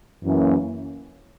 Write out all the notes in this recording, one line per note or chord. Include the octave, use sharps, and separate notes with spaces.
F#2 E3 A#3 C#4